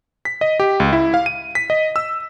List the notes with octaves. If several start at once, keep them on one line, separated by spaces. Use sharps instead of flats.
B6
D#5
G4
C#2
E4
F5
D#7
B6
D#5
E6